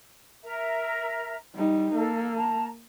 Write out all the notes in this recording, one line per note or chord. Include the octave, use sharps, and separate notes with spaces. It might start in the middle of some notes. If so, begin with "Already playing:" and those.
A#4 E5 A#5
G3 D#4
A#3 A4
A5 A#5